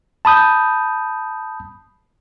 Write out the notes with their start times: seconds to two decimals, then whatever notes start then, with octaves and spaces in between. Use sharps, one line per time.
0.25 A5 B5 D#6 G6